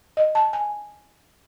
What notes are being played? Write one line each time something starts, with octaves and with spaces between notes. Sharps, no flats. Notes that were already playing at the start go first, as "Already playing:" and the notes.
D#5
A5
G#5